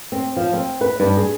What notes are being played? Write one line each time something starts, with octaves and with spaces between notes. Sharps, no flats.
C4
F3
C4
B4
G2
G#4